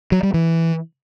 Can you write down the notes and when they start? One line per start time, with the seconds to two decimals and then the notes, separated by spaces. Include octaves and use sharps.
0.12 F#3
0.23 G3
0.34 E3